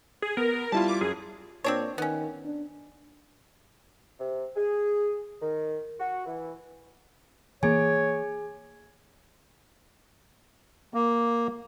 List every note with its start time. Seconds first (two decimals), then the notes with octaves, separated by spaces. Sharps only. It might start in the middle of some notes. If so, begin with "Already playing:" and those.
0.22 G#4
0.37 B3 A#4
0.72 G3 E4 F4 A5
0.88 D6
1.01 F#2 G#4
1.64 A#2 C4 D4 C#5
1.98 D#3 B3 C#4
2.45 D4
4.19 C3
4.56 G#4
5.41 D#3
5.99 F#4
6.26 E3
7.63 E3 A#3 G#4 C#5 G#5
10.94 A#3